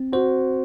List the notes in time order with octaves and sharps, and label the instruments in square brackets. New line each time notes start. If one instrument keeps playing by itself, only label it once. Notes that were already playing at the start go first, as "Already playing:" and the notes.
Already playing: [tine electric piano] C4
[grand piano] F#4 [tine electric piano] C5